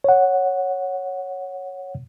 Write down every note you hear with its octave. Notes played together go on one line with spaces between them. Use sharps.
C#5 F#5